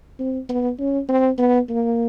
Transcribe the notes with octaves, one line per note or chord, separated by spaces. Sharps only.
C4
B3
C#4
C4
B3
A#3